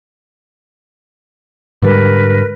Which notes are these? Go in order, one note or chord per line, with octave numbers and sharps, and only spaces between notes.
G#2 D3 G3 A#4 B4